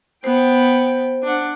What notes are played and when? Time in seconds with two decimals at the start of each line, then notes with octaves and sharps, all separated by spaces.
0.24 B3 C5 G5
1.23 D4 F#5